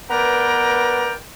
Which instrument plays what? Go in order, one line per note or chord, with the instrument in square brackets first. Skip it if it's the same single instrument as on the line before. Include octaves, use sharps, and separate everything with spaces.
[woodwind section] B3 A#4 B4 D5 G5 A#5